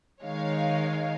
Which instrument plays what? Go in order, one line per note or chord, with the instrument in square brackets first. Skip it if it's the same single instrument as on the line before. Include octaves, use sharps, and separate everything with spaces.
[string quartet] D#3 G#3 D#4 [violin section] C#5 F5